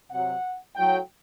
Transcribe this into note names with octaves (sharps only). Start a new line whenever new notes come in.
C3 F#3 F#5
A2 F#3 G5